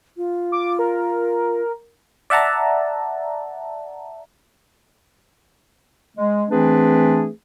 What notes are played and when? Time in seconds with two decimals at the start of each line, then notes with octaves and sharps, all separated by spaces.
0.17 F4
0.52 D6
0.79 A#4
2.30 D5 E5 F#5 A5 A#5
6.16 G#3
6.50 E3 A3 C4 D4 G#4 B4